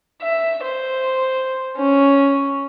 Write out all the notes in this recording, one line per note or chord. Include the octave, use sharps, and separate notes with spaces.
E5
C5
C#4